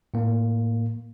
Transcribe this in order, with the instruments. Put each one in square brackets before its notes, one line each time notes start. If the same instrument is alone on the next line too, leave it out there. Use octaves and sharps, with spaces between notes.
[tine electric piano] A2 A#3